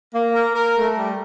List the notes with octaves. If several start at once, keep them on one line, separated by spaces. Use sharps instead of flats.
A#3
A#4
A#4
A3
G3